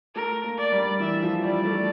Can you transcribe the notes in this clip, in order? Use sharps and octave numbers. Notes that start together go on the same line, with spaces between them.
A3 A#4
A#3
D5
G3
E3 E5
F3
G3 D5
A3